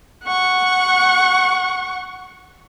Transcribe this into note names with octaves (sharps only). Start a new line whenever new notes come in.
F#5 C#6